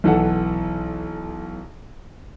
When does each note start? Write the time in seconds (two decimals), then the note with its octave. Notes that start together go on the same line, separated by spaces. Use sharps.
0.04 B1 E3 A4 F#5